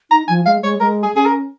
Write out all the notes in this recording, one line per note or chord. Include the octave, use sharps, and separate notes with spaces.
D#4 A#5
F3 G#5
G#3 F5
G#3 C#5
G#3 A#4
G#4
C#4 G#4
A#4